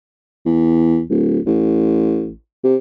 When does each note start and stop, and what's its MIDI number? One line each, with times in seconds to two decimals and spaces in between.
0.46 1.03 40
1.10 1.39 26
1.46 2.34 33
2.64 2.76 48